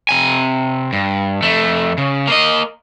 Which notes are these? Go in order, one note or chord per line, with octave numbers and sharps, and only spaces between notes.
C3 G#5
G2
F2 A3
C#3
A#3 D#5